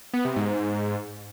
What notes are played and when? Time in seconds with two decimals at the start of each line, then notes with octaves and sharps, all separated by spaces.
0.14 B3
0.25 C3
0.36 G#2